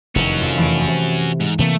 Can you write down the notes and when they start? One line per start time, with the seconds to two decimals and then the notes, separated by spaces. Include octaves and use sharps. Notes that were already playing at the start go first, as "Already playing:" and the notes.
0.15 F1 E2 D#3 F#3 C#4
0.41 F2
0.58 E3 A3 D7
0.87 C3
1.40 G#2
1.59 C3 E3 A3 A#3